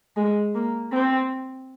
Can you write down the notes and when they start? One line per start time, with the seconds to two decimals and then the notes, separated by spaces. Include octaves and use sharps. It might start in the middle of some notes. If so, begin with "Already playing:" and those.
0.17 G#3
0.55 A#3
0.92 C4